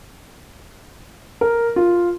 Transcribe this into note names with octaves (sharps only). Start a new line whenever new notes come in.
A#4
F4